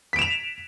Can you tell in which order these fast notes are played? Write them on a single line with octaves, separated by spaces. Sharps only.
B6 D7 E7 F7